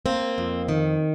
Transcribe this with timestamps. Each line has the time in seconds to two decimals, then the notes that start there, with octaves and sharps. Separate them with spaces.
0.06 A#3 C4
0.38 F2
0.69 D#3